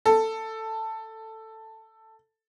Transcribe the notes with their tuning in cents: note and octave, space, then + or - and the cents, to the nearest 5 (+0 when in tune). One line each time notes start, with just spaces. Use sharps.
A4 +10